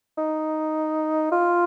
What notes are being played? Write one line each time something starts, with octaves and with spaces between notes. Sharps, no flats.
D#4
F4